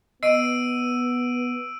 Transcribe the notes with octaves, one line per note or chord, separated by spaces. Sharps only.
B3 D#5 E6 D7 D#7